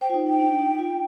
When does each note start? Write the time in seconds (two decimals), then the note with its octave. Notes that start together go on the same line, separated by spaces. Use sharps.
0.01 C5 G5
0.10 F4
0.14 D#4
0.27 D#4 G5
0.40 D4
0.59 D#4
0.79 F4